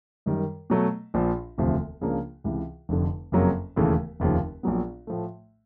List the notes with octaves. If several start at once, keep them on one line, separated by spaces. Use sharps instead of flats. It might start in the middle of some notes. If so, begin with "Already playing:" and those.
F#2 D#3 G3
B2 F#3 A3
A#1 A#2 F3
E1 D2 C3 F3
C#2 C#3 F3 A#3 D4
C#2 C3 E3
F1 F2 D3
F#1 F2 C#3 F#3 A#3
E1 D#2 C#3 E3 A3
F1 D#2 C#3 F3
A#1 A#2 F#3 B3
A2 F3 A3